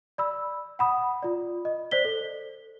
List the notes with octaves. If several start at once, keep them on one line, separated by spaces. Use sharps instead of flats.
D5 B5 E6
F#5 B5 D#6
F4 D5
D#5
C5 D5 B6 G7
A4